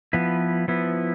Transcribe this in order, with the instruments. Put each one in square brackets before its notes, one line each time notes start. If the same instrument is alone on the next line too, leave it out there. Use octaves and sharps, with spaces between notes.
[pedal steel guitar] F3 B3 E4 B4
F3 B3 E4 B4